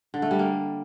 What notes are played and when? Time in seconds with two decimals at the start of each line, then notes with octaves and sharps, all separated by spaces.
0.14 D3
0.22 A3
0.31 G3
0.39 A#3